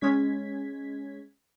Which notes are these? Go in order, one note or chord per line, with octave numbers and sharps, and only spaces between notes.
G#3 C#4 G#6 B6